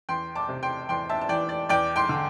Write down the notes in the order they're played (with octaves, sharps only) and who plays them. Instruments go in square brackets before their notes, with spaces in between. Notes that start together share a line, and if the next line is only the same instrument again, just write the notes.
[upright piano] E2 G5 C6
A5 D6
C3
G5 C6
E2 G5 C6
E5 A5
A5
E3 D5 G5
D5
E2 D5 G5
G5 C6
D3